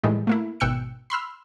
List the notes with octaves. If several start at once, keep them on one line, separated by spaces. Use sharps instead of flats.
A2 D#3 E3 G3 G#3
A3 A#3 E4
G#1 B2 G5 E6 F#6 C#7
B5 C6 E6 F6